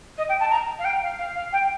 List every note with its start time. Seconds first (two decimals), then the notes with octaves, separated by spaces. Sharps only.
0.17 D#5
0.29 G5
0.40 A5
0.50 A#5
0.79 F5
0.84 G5
1.02 F5
1.19 F5
1.35 F5
1.52 G5